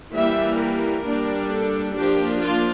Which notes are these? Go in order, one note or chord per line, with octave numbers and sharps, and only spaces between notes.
E3 G3 A#3 E5
A#4
G3 A#3 D4
A4
F3 A#3 D4 G4
F4